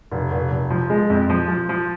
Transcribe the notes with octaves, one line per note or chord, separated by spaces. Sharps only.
F1
F1
F1
F3
G#3
F2
F3
F3
F3